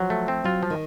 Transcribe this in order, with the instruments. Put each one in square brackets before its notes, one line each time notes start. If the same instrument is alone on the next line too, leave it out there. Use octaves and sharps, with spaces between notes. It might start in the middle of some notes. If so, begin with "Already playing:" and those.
Already playing: [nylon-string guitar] F3 [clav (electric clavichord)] F#3
[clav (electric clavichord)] A3
C4
[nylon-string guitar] F#3 [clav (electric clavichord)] F4
[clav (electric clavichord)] F3
[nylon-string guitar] D#3